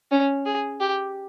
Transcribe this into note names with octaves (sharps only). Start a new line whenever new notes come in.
C#4
G#4
G4